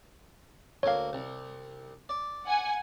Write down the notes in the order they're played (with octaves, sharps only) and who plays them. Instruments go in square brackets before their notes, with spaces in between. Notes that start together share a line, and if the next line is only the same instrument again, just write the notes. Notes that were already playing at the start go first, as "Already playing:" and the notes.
[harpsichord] D2 A#3 [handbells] C#5 F5
[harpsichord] C2
D5
[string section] F#5 G#5